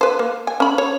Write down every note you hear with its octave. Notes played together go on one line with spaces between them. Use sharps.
B4 C5
A#3
G#5
C#4 B5
C#5